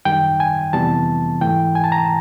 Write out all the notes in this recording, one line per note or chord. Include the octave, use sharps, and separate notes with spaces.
F#2 D#3 G3 G5
G#5
F2 C3 E3 G3 B3 A5
G#2 E3 A3 G5
G#5
A5
A#5